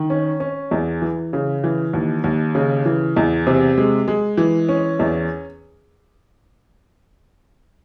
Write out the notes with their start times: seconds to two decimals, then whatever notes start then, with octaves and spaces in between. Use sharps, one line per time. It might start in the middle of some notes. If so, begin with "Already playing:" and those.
Already playing: D#3
0.10 C#4
0.40 C#4
0.71 E2
1.02 E3
1.33 C#3
1.64 E3
1.93 D#2
2.24 D#2
2.55 C#3
2.85 E3
3.16 E2
3.47 C3
3.78 G#3
4.08 G#3
4.37 E3
4.69 C#4
4.99 E2